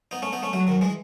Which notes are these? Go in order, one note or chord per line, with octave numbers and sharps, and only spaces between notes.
B3 D#4
A3 C#4
B3 D#4
A3 C#4
F#3 A3
D#3 F#3
E3 G#3